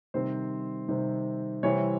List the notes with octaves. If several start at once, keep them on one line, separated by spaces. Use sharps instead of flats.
C3 D#3 G3 C4 C5
C3 D#3 G3 C4
C3 E3 G3 C4 E4 C#5